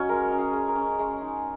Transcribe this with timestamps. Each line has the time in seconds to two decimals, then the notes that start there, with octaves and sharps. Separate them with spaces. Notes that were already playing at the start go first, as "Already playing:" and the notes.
Already playing: F#3 C#4 C#5 D#5
0.09 G#3 A#4
0.32 C#4
0.39 G#4
0.53 G#3
0.69 A#4
0.76 C#4
0.99 G#3
1.21 D#4